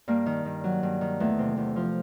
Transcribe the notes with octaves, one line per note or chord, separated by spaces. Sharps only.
G2 A#3
D#3
G2
F#3
G2
D#3
E2 A3
C3
E2
F3